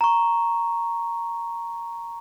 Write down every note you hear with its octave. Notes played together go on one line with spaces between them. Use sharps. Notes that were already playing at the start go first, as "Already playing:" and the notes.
A#5 C#6